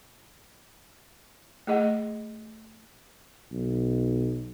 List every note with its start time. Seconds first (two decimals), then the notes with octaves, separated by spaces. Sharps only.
1.67 A3 G#4 D#5 F#5
3.52 B1